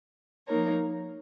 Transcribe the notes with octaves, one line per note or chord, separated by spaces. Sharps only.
F3 A#3 D#4 A#4 C#5